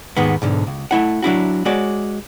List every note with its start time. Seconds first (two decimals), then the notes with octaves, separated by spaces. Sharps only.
0.17 D#2 G#2 D#3 G#3 B3
0.42 B1 G#2 D3
0.67 C#2
0.91 A3 E4 F#5
1.22 F#3 D4 E4 F#4
1.65 G#3 F#4 C#5 D5